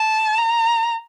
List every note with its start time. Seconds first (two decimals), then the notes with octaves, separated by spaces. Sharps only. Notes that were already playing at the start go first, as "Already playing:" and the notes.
Already playing: A5
0.37 A#5